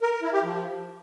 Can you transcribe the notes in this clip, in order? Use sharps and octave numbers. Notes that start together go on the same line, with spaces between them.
A#4
A#4
E4
G4
F3